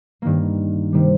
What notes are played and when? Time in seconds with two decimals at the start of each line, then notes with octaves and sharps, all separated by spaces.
0.22 G2 D#3 A#3
0.92 C3 D#3 G3